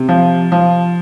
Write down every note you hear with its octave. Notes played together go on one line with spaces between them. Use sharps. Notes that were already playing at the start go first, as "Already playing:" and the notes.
Already playing: C3
F3
F3